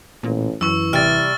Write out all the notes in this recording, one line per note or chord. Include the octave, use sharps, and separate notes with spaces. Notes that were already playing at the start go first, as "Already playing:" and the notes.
A1 A#2
F#2 E3 C#6 E6
A1 C3 G3 F6 A6